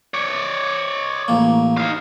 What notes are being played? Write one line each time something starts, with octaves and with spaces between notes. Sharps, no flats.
C#5 D5
A1 A#3
D#4 F5